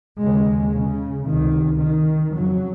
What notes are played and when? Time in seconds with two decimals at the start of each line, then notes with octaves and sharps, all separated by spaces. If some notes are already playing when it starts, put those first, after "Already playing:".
0.20 D#2 C#3 G#3
0.73 C#3
1.26 C#2 C3 D#3
1.80 D#3
2.34 F2 C#3 F#3